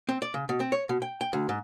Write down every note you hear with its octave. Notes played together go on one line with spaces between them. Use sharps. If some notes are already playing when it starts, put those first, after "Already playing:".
C4
D5
C#3
B2
C4
C#5
B2
G5
G5
D2
G#2